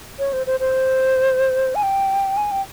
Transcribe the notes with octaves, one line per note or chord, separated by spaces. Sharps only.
C#5
C5
C5
C5
G#5
G5
G#5
G5